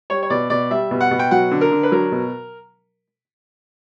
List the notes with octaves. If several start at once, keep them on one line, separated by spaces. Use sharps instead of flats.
G3 C#5
C#5
B2 D5
B2 D5
G3 E5
B2
F#5
B2
G5
F#3 F#5
D3
A#4
D3
B4
F#3 A#4
B2